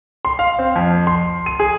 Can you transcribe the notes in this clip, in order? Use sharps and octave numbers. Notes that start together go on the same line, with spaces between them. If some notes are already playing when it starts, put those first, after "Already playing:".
C6
F5
C4
F2
C6
D#7
G#4